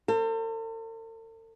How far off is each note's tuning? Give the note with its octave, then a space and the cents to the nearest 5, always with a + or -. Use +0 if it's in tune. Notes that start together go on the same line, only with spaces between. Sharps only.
A4 +45 C5 +15